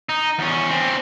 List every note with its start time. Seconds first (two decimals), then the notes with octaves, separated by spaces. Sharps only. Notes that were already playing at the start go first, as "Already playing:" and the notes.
0.09 D#4
0.39 E2 C#4
0.70 C4 D4